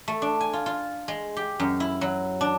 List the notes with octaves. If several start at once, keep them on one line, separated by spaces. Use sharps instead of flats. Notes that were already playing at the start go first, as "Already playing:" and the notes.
A3
D4
G#5
F4
F4
G#3
G4
F#2
E4
F#3
D4